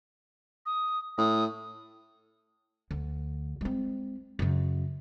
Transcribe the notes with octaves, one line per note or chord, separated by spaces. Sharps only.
D#6
A2 D#6
D2
G#3 C4
F#2 C#3